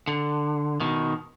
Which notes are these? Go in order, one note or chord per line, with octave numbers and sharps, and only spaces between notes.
D3
B2 D#3